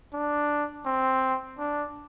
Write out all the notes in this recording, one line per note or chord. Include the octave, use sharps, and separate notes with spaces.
D4
C4
D4